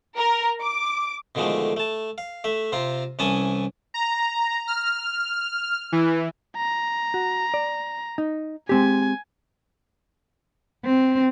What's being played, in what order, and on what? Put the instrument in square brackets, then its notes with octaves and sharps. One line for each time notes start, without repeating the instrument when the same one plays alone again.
[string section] A#4
D6
[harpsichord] B2 D3 D#3 F3 G#3 A3
A3 A5
F5
A3 E5
C3 C4 F4 A#5
C2 E3 C#4 G#5 A5 D#6
[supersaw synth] A#5
F6
E3
[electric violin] A#5
[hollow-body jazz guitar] F#4
D5
D#4
[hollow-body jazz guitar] G#3 C4 G4 [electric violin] G#5
[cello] C4